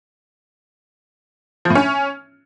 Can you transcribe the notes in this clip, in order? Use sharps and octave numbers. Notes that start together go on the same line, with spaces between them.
F3
A2
C#4